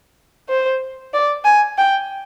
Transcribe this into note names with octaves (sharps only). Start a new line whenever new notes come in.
C5
D5
G#5
G5